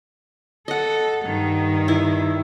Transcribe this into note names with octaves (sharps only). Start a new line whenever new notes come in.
A4 D#5 F#5
G2 D#3
E4